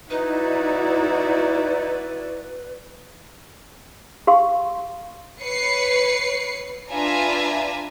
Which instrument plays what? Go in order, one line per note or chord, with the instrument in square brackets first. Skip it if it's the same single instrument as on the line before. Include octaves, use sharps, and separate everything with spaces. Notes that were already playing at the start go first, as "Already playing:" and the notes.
[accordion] D#4 [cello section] E4 F#4 D5 [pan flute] B4
[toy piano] G4 F5 C6 C#6
[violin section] B4 C#5 C7 C#7
D4 F4 B4 E5 G#5 A#5